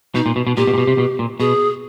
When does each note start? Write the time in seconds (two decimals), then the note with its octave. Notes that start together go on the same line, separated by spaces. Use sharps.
0.15 B2 D#4
0.26 A#2
0.36 B2
0.47 B2
0.57 A#2 G4
0.67 B2
0.74 A#2
0.78 B2
0.87 C3
0.98 B2
1.19 A#2
1.40 B2 G#4